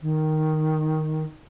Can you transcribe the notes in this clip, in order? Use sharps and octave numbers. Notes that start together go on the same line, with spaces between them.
D#3